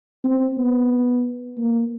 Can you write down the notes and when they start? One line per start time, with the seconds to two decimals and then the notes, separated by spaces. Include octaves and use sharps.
0.24 C4
0.58 B3
1.58 A#3